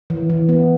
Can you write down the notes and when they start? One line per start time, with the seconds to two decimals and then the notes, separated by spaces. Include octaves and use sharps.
0.10 E3
0.30 E3
0.49 B3